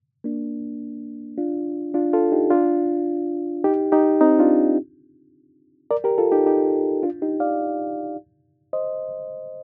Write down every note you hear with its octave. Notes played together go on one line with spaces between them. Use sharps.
A#3 D4
D4 F4
D4 F4
F4 A4
D#4 G4
D4 F4
D#4 G4
D#4 G4
C4 D#4
D4 F4
A#4 D5
G4 A#4
F4 A4
D#4 G4
D#4 G4
D4 F4
D#4 G4
D5 F5
C5 D#5